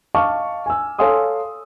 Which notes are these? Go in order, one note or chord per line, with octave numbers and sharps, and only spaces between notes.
D#5 F5 A5 C#6 D6 F6
G#5 E6
A4 C#5 F5 G#5 C6 D#6